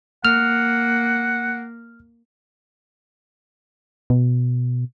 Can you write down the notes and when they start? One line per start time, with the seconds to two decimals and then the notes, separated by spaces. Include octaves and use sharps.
0.25 A#3 F#5 F6
4.10 B2